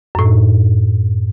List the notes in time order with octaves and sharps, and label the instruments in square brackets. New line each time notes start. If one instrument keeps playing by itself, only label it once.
[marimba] F#2 A2